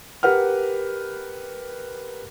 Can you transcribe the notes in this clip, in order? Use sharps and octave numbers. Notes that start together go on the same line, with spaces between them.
G4 A#4 B4 F#5 F6